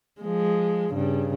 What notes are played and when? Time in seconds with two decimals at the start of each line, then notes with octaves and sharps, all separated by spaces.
0.21 F3 G#3
0.93 G2 C#3